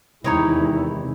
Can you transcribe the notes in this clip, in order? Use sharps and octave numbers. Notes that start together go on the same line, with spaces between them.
E2 C3 D#3 G#3 D#4 E4 C#5 D#5